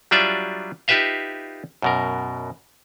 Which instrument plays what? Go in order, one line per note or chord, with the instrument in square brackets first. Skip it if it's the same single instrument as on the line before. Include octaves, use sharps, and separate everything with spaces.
[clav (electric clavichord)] F#3 G3 D4 F4 D5 E5
D#4 F4 G4 B4 E5 F5
F#2 B2 A#4